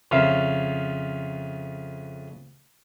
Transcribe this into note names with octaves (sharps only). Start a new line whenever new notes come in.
F2 C#3 F4 E5